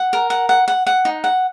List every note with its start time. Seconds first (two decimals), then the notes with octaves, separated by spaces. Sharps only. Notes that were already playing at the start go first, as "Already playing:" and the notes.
Already playing: F#5
0.13 A#4
0.30 F#5
0.49 F#5
0.68 F#5
0.87 F#5
1.05 D#4
1.24 F#5